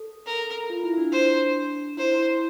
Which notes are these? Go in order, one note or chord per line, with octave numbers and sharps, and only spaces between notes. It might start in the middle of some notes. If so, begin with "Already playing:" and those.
Already playing: A4
A#4
F4
E4
E4
D4
C5
E4 C5
E4
E4